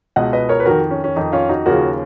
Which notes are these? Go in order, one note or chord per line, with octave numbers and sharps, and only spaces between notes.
C#2 B2 D#5 F#5
B4 D#5
A#4 C#5
B4
F2 D#3 F#4 A#4
C#4
C#4
F2 D#3 D#4
C#4 F4
D#4 F#4
D#2 C#3 F3 F#4 A#4